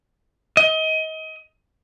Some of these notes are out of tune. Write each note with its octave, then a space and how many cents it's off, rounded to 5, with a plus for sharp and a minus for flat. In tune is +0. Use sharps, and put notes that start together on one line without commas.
D#5 +30